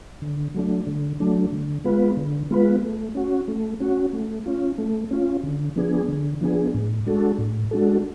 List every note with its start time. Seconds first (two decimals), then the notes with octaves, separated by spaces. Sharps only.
0.22 D3
0.55 F#3 A3 D4
0.87 D3
1.20 F#3 A3 D4
1.52 D3
1.84 G#3 B3 F4 B4
2.17 D3
2.51 G#3 B3 F4 B4
2.83 A3
3.15 C#4 F#4
3.48 A3
3.80 C#4 F#4
4.13 A3
4.46 C#4 F4
4.78 A3
5.11 C#4 F4
5.43 D3
5.76 F3 B3 D4 G#4
6.08 D3
6.41 F3 B3 D4 G#4
6.74 A2
7.06 G#3 D4 F#4 A4
7.38 A2
7.71 G#3 D4 F#4 A4